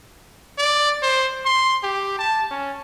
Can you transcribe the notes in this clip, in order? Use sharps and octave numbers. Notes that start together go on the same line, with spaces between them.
D5
C5
C6
G4
A5
C#4